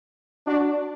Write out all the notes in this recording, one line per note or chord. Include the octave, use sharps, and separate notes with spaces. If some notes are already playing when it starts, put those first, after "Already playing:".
D4 F#4